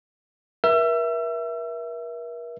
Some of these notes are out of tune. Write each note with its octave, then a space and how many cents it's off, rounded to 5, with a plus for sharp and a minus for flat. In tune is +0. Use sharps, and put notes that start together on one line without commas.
A#4 +40 E5 +0 E6 +35